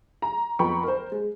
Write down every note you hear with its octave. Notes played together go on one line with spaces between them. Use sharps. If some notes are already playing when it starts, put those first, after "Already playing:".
A#5
F2 B3 G5 A#5 B5 C#6
A#4 C5
G#3